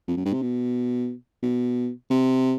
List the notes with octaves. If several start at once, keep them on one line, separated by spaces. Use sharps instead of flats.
F2
F#2
G2
C3
B2
B2
C3